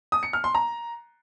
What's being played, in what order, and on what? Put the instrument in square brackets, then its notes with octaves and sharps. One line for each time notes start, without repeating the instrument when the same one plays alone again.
[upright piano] D#6
C#7
F6
C6
A#5